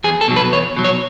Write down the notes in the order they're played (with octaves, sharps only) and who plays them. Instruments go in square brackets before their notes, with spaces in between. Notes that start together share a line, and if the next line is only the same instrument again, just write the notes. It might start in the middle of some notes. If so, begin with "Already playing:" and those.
[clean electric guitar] E2 G#4
A4
B2 F#3
B4
E2 C#5
B2 F#3
C#5